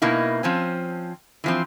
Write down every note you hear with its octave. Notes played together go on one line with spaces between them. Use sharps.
B2 A#3 D#4 E4
F3 C4 C#4
E3 F3 C4